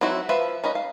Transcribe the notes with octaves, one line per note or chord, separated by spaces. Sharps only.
F#3 C4 D#4 E4 F#4
F3 B4 E5 F5
C#4 A#4 B4 D#5
F5